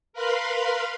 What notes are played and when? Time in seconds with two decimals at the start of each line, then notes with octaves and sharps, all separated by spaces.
0.13 A#4 B4 F5 B5 C6